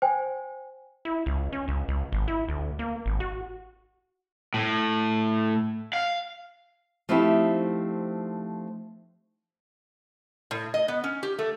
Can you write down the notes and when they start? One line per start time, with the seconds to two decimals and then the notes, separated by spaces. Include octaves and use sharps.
0.02 C5 G5 G#5
1.05 E4
1.26 C#2
1.53 C#4
1.68 C#2
1.88 C#2
2.12 G#1
2.28 E4
2.49 D2
2.79 A#3
3.06 G#1
3.20 F#4
4.54 A2
5.93 F5
7.09 F3 A3 C4 D#4 E4 G4
10.51 A2
10.74 D#5
10.88 B3
11.04 C#4
11.23 G4
11.39 A3